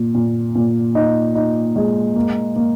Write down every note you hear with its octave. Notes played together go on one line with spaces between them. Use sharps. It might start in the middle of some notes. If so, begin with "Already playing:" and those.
Already playing: A#2
A#2
A#2
D#4
D#4
G#3
A#3
A#3